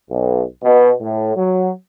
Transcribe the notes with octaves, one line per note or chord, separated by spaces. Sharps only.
B1
B2
A2
F#3